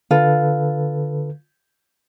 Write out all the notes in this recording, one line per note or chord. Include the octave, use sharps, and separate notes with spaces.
D3 F4 A4 B4